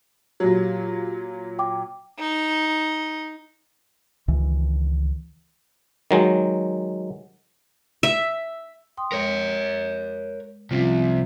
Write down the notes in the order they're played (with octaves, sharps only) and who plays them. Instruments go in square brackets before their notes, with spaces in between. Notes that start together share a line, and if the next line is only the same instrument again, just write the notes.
[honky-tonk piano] A#2 F#3 [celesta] G4
[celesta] G5 D6
[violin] D#4
[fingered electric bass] C#2 D#3 E3
[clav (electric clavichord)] D#3 F#3 G#3
[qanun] E5
[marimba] G5 C6 D#6
[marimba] G#3 [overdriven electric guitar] A#4 C#5
[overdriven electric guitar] C2 C3 [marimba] F3 C#4 F4